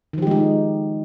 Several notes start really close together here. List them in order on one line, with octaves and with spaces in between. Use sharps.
D#3 F3 G4 G#3 D#4